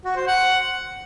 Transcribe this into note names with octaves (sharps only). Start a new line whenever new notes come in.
F#4
C5
F#5